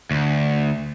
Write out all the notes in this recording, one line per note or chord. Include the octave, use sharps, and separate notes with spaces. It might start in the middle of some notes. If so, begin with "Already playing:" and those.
D2